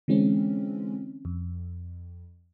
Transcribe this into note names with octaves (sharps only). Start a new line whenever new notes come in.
D3 E3 G#3 C4 C#4
F2